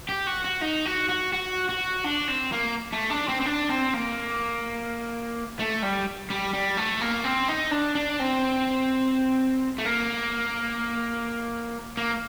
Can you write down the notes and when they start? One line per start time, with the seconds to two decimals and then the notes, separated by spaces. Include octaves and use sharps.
0.09 G4
0.27 F#4
0.45 F#4
0.62 D#4
0.86 F#4
1.09 F#4
1.33 F#4
1.69 F#4
2.04 D4
2.28 C4
2.52 A#3
2.93 A3
3.11 D4
3.29 C4
3.41 C4
3.46 D4
3.70 C4
3.94 A#3
5.59 A3
5.83 G3
6.30 G3
6.54 G3
6.77 A3
7.01 A#3
7.24 C4
7.49 D#4
7.71 D4
7.95 D4
8.20 C4
9.79 A3
9.85 A#3
11.97 A#3